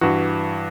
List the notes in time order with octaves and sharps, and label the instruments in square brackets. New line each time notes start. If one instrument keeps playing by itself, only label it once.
[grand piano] G2 E3 F#4